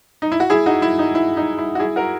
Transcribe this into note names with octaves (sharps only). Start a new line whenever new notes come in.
D#4
E4
F#4
E4 G#4
D#4 F#4
E4
D#4
E4
D#4
E4
F#4
E4 G#4
F#4 A#4